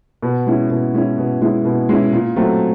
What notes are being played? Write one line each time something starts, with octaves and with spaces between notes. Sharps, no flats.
B2
G#3 C#4 E4
B2
G#3 C#4 E4
B2
G#3 C#4 E4
B2
G#3 C#4 E4
A#2
F#3 A3 C4